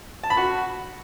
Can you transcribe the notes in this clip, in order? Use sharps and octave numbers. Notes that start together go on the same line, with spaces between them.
A5
B5
F#4